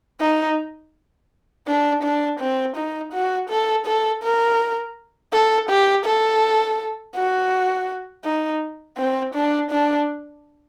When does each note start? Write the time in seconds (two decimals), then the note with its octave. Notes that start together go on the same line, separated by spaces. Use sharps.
0.20 D#4
1.67 D4
2.03 D4
2.39 C4
2.76 D#4
3.13 F#4
3.49 A4
3.86 A4
4.23 A#4
5.32 A4
5.69 G4
6.05 A4
7.14 F#4
8.24 D#4
8.97 C4
9.34 D4
9.70 D4